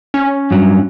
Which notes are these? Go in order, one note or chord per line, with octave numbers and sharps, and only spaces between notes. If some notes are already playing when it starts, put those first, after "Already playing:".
C#4
G2 F#3